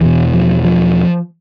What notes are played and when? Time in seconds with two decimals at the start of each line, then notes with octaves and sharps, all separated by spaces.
0.01 E2 B2 E3
0.33 F3
0.65 F3